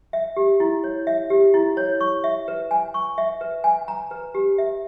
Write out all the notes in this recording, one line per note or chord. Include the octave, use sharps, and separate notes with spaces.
E5
G4
E4
C#5
E5
G4
E4
C#5
C#6
E5
B4
G#5
C#6
E5
B4
G#5
A#5
B4
G4
E5